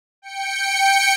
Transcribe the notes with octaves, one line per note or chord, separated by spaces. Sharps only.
G5 C#7